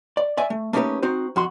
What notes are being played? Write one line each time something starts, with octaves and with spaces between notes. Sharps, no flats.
D5
D5 E5 G#5
A3
A3 A#3 C#4 D#4 G4 B4
C4 D#4 F#4 C5
F2 F#4 C6